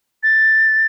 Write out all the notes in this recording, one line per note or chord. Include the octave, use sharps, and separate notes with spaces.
A6